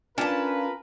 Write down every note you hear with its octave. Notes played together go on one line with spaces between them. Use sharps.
C#4 D4 F4 A#4 B4 A5